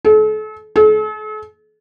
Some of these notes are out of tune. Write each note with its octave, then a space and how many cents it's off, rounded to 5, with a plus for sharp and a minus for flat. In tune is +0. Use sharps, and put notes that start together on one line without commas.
A4 -40
A4 -45